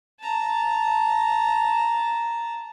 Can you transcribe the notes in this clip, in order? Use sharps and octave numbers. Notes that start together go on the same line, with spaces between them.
A5 A#5